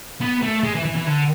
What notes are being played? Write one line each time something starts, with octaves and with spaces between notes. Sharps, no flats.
B3
A3
G#3
E3
E3
E3
D3